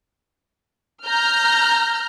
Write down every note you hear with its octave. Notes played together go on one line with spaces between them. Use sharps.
A#5 F6 G6